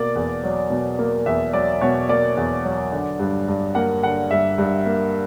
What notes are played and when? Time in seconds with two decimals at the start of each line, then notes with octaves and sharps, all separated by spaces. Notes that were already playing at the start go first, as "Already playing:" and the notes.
Already playing: B2 A#3 D5
0.15 E2
0.44 F#3
0.70 B2
0.99 A#3
1.26 E2 E5
1.53 F#3 D5
1.81 B2 C#5
2.09 A#3 D5
2.37 E2
2.65 F#3
2.92 D3
3.19 G2
3.48 G2
3.75 A#3 F#5
4.03 D3 F#5
4.31 G2 E5
4.58 G2
4.86 A#3